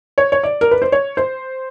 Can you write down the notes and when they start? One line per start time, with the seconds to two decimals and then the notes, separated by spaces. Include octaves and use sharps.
0.18 C#5
0.32 C#5
0.43 D5
0.61 A#4
0.71 B4
0.82 C5
0.92 C#5
1.17 C5